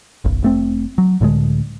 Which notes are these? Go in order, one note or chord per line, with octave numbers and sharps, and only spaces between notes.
F#1 B1
F1 A3 C4
F#3
C#2 A2 D3 G#3